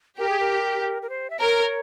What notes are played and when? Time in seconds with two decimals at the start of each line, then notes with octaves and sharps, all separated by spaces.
0.19 G4 A#4
0.29 G#4
0.40 A#4
1.02 A#4
1.09 C5
1.30 E5
1.40 A#4 C#5